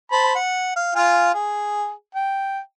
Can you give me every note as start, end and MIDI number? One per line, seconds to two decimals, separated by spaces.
0.12 0.35 72
0.12 0.35 81
0.12 0.35 83
0.35 0.73 78
0.76 0.94 77
0.96 1.31 65
0.96 1.31 77
0.96 1.31 80
1.34 1.91 68
2.15 2.59 79